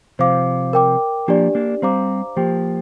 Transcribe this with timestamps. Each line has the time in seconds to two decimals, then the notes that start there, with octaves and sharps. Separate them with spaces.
0.19 C3 F3 C5 F5 D6
0.73 A#4 G5 D6
1.28 F3 A#3 D4 G4 D5
1.55 A#3 D4
1.82 G3 C4 C5 F5 A#5 D6
2.36 F3 A#3 G4 C5 G5